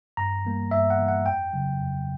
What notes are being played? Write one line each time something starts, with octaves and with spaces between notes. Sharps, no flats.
G2 A#5
E3 G3 A#3
G2 E5
F#5
E3 G3 A#3
F#5
F2 G5
C#3 F#3
F2